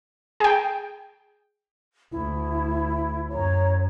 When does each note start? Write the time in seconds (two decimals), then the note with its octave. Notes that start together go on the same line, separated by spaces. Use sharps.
0.40 G#4 G5
2.12 D2 E4
3.31 F#2 C#5 A#5